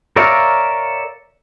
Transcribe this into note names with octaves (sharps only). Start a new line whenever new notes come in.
A#4 C#5 D5 E5 F5